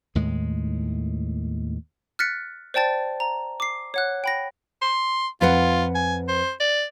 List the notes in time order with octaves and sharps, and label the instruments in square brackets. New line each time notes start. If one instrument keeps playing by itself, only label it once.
[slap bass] D#2 A2 G#3
[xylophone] F6 F#6 A6 B6 C#7
C5 D5 G5 A5 A6
A#5
D6 C7
C#5 F#5 F#6
G5 B5 A#6
[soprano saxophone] C6
[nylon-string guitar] F2 B4 F#5 [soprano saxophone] F4
[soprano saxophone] G#5
C5
D5